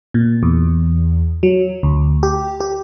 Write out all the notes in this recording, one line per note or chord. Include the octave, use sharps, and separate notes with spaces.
A#2
E2
F#3
D2
G4
G4